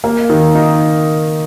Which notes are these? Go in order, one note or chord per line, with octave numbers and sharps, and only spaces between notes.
A#3
D#3
D#4